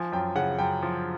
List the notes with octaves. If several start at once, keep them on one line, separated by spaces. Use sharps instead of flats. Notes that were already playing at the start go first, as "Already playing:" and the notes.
Already playing: F3 G#5
F#2 G5
C#3 F#5
F#2 G5
F3